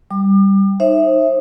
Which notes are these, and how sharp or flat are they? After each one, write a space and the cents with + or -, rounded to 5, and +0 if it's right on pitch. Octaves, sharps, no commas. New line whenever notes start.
G3 +0 D6 +35
D#4 +0 C5 +35 E5 +0